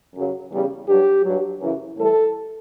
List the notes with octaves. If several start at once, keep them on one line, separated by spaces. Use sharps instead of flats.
F#2 C#3 F#3
E2 C#3 G3
G2 F#3 G4
G2 F#3
F#2 C#3 E3
A2 E3 G3 A4